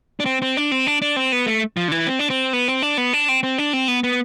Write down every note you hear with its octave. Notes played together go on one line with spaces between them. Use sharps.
D4
C4
C4
D4
C4
D4
D4
C4
B3
A3
F3
D3
E3
C4
D4
C4
B3
C4
D4
B3
D4
C4
C4
D4
C4
B3
B3